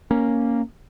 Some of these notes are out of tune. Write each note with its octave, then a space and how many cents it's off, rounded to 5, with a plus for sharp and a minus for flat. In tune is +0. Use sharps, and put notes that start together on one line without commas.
A#3 +0 C#4 +0